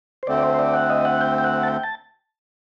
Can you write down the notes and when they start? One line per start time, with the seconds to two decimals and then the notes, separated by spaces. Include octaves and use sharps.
0.23 C5
0.27 D2 D3 A3 C4 D5
0.38 D5
0.43 C5
0.54 C5
0.59 D5
0.74 F#5
0.90 D#5
1.05 F#5
1.21 G5
1.38 G5
1.44 F#5
1.63 A5
1.68 G5
1.83 A5